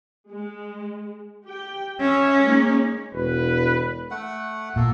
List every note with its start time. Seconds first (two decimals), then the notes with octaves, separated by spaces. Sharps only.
0.31 G#3
1.44 G4 G5
2.00 C#4 E5
2.41 G#3 A#3 D#4
3.14 E1 B4
4.11 A3 F#5
4.76 A#2 A#3 A4